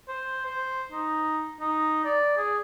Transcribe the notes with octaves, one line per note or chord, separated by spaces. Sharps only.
C5
C5
D#4
D#4
D5
G#4